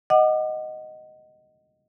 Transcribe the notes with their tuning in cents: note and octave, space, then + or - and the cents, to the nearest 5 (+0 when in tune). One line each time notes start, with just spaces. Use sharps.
D#5 +0 F#5 +5 D6 +35